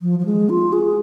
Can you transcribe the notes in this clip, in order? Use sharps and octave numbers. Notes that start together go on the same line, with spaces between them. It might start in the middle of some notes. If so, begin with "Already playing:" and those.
F3
F3
G#3
F4
G#4